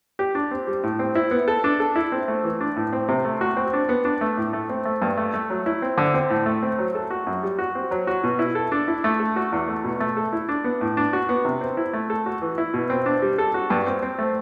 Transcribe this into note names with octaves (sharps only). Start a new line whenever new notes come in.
G4
D4
C4
G3
A2
C4
E4
B3
A4
D4
A4
E4
C4
A3
E3
D4
A2
C4
C3
A3
F#4
C4
D4
B3
D4
A3
A2
A3
C4
A3
G2
A3
A3
F#3
E4
C4
D3
C4
A2
A3
C4
F#3
A4
F#4
F#2
G3
F#4
C4
F#3
F#4
B2
E4
A4
D4
E4
A3
A4
F#4
E2
A3
B2
A3
A4
E4
D4
B3
A2
D4
F#4
B3
C3
C4
E4
A3
A4
F#4
E3
E4
B2
C4
D4
G3
A4
F#4
G2
C4
C4
A3